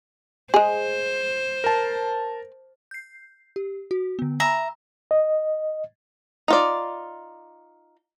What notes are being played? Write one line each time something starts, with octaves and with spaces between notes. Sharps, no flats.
G#3 G#4 C5
A#4 A5
G6 C7
G4
F#4
D3 B3
E5 G#5 A#5 B5
D#5
D#4 F4 D5